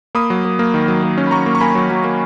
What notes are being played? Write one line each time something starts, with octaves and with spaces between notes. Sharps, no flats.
A#3 B5 D#6
F#3
A#3
A#3
D#3
F#3
A#3
C#4
B5
F#3 A#5 C#6
A#3
C#6
A#3 G#5 B5
F#3
F#3
A#3